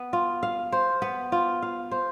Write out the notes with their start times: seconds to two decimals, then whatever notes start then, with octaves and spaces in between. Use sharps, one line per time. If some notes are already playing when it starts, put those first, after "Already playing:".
Already playing: B3
0.13 F4
0.43 F5
0.72 C5
1.02 B3
1.32 F4
1.62 F5
1.91 C5